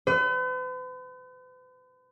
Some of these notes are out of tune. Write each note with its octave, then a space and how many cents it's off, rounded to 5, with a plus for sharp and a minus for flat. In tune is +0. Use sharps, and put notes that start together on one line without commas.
B4 +45